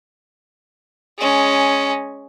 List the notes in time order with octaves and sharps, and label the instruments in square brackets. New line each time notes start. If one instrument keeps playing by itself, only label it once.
[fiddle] G#3 C#4